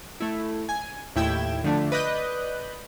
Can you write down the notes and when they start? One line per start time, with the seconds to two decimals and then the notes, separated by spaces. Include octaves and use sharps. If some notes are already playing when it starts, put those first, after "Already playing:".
0.20 A3 E4
0.69 G#5
1.16 D#2 A2 E4 G5 G#6 E7
1.64 D3 F3 A3 D4
1.92 B4 D5 D#5 D#6 F#6 G6